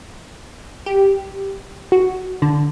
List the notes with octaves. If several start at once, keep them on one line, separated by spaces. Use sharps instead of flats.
G4
F#4
D3